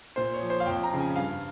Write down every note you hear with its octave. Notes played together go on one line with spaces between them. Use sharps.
A#2 C5
C#5
F3
C5
F5
F2 G5
A#5
C#3 F3
G#5
G2 F5